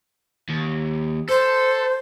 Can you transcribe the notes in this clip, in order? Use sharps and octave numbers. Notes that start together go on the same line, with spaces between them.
D#2
A4 C5